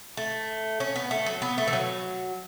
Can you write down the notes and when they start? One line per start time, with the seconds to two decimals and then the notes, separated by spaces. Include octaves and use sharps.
0.17 A3
0.80 C#4
0.96 B3
1.11 A3
1.26 F#3
1.42 B3
1.58 A3
1.68 E3
1.73 F#3